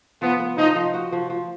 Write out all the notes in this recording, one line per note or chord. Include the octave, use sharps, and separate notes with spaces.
F3 B3
B3
F3 D#4
F3
F#4
F3
F3